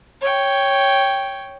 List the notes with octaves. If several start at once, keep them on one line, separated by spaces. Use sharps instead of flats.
C#5 G5